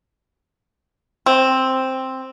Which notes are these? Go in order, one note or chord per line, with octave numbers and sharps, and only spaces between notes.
C4